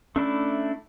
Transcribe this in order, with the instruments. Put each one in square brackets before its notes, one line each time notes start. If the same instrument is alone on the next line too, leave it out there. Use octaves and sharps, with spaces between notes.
[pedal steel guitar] A3 D4 E4 [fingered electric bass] C#4